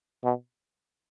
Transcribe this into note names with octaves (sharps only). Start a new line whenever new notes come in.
B2